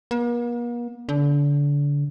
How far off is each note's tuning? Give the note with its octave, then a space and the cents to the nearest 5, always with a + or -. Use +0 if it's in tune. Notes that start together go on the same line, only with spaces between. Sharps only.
A#3 +45
D3 -30